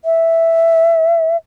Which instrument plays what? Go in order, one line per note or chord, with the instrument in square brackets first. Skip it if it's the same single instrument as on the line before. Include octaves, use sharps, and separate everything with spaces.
[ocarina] E5